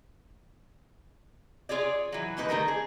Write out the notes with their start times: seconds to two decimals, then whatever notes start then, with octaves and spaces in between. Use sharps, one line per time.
1.69 F4 G#4 C#5 D5
2.12 E3 F#3
2.37 B2 A#3 D#4 B4
2.49 D#3 G3 A3 A#4
2.68 G#4